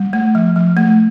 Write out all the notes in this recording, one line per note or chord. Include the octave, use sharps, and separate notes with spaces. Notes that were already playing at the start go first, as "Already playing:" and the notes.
Already playing: G3
A3
F3
F3
A3